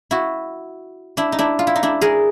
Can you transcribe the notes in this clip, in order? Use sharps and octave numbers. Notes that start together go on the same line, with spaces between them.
E4 F#4
D4 E4
D#4
D4 E4
F4
E4
D#4
D4 E4
G#4 A#4